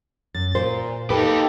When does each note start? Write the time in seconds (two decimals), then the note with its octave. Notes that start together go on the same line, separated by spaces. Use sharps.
0.35 F#2 A6
0.55 A#2 C5
1.10 D#4 G4 A4 B4